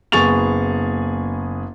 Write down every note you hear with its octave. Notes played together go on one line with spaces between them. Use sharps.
F#1 B3 G#4 C#6 A6 F7